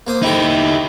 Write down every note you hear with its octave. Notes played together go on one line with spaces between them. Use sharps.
A#3 C5 D#6
D#4 E4 G4 A4